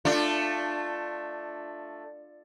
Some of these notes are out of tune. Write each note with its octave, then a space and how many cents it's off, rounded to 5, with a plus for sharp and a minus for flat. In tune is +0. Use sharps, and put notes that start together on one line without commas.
A3 +5 D4 +20 F4 +0